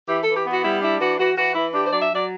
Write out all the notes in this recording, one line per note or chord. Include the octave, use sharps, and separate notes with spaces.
E3 G4
E3 A4
G4
B3 F#4
G3 E4
D4 E4
E3 F#4
E3 F#4
E3 F#4
E3 E4
D4 G4
C5
F#3 D5
E5
F#3 D5